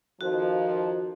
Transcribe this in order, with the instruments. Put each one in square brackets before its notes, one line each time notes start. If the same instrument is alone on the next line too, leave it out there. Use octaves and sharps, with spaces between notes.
[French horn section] F2 D#3 F3 [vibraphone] F#4